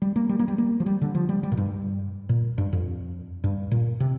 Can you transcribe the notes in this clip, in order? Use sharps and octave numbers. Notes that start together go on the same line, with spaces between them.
G3
A#3
G3
A#3
G3
A#3
F3
G3
D3
F3
G3
G3
A#2
G2
A#2
G2
F2
G2
A#2
C3